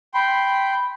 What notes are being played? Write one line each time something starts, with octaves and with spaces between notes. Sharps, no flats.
G5 B5 C6